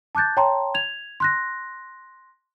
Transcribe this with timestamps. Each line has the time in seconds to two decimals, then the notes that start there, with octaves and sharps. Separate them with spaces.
0.15 A5 D6 F#6 G6 A6
0.37 C#5 G5 A5 A#5 C6
0.74 G#6 F7
1.20 C6 F#6 A#6